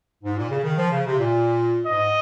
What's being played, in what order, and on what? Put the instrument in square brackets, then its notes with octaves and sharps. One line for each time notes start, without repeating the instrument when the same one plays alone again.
[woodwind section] G#2
A#2
C#3
D#3
F3
C#3
C3
A#2
[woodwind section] G#2 [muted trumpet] D#5